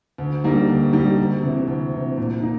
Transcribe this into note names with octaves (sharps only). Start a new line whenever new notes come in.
D2
D3 G3 A#3 D#4
D2
D3 G3 A#3 D#4
D2
C3 E3
D2
C3 E3
A#2
A#3 D#4